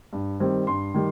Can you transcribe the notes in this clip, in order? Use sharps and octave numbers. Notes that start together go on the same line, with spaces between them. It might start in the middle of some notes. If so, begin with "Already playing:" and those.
G2
D#3 G3 C4
G2 C6
D#3 G3